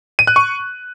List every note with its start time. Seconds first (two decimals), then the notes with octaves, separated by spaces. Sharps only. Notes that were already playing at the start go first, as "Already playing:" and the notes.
0.19 D#7
0.27 F#6
0.36 C#6